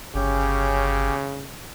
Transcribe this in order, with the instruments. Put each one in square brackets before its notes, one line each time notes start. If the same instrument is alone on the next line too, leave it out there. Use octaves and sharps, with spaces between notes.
[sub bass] G1 [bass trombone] C#3 [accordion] C#4 G4